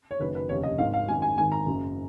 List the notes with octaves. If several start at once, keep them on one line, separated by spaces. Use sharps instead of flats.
C#5
F#1 F#2 D#3 B4
B4
F1 D#2 C#3 C#5
D#5
G#1 G#2 D#3 F5
F5
G#1 F#2 D#3 G#5
G#5
G#1 G#2 D#3 G#5
A#5
F#1 F#2 C#3